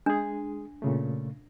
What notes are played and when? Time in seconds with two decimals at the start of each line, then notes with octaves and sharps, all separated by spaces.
0.06 G#3 D4 G#4
0.82 A#2 C#3 A3